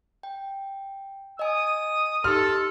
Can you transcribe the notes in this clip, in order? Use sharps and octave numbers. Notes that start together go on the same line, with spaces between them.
G5
D#5 G#5 D#6
D#4 G4 A4 C6 F6